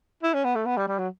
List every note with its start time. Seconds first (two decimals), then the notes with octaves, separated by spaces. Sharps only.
0.23 E4
0.34 C#4
0.44 B3
0.55 A3
0.66 B3
0.77 G3
0.88 G3
0.99 F#3